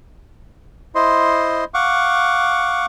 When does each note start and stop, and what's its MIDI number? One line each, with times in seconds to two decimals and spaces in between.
0.95 1.64 64
0.95 1.64 72
0.95 1.64 75
0.95 1.64 84
1.74 2.86 77
1.74 2.86 78
1.74 2.86 85
1.74 2.86 86